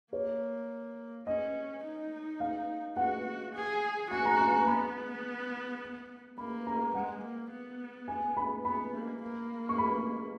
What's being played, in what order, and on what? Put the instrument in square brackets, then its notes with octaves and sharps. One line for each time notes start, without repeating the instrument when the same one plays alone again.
[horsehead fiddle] A#3 [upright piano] C#5
[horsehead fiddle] C#4 [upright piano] D#5
[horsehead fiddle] D#4
[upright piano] F5
[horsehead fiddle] F#4 [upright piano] F#5
[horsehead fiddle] G#4
[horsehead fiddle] F#4 [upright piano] G#5
[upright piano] A#5
G#5
A#5
[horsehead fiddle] B3 [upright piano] B5
[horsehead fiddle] A#3 [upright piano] B5
[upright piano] A#5
[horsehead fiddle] G#3 [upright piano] F#5
[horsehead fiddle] A#3
B3
[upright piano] G#5
B5
[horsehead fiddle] B3 [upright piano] B5
[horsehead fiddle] A#3
A#3
[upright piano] C#6
B5